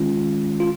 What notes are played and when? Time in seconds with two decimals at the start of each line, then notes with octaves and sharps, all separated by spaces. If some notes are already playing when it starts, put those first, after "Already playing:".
Already playing: D#3 G#3 C#4 F4
0.60 F4